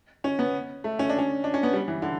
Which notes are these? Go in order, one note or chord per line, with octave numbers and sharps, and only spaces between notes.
C#4
B3
A3
C#4
D4
C#4
D4
C#4
B3
G3
E3
D3